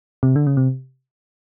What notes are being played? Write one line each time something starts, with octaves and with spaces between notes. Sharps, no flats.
C3
D3
C#3
C3